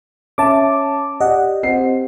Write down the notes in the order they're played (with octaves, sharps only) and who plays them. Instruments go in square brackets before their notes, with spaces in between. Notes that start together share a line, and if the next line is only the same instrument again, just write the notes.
[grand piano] C#4 E5 [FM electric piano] A5 D6
[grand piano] G4 D5 [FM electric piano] D#5 F#5
[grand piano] C4 G4 C7